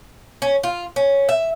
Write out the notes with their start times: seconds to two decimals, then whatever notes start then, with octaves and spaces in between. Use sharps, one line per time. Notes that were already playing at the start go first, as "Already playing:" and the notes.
0.42 C#4
0.63 F4
0.96 C#4
1.29 E5